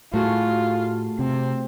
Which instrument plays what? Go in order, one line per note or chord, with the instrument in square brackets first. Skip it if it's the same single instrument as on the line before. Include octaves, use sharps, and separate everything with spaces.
[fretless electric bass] A2 [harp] A3 F#4 G#4 [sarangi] F4
[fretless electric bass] C3 [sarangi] C4